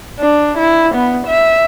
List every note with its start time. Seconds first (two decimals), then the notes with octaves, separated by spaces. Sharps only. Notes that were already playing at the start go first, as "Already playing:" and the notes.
0.19 D4
0.58 E4
0.95 B3
1.27 E5